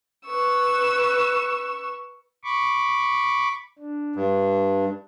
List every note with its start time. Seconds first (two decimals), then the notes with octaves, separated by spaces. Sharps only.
0.24 B4 C#6 E6
2.44 B5 C#6 D6
3.79 D4
4.16 G2